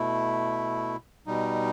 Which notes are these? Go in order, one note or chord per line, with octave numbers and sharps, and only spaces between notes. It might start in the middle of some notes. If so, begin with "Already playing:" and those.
Already playing: B2 A3 E4
B2 G3 D#4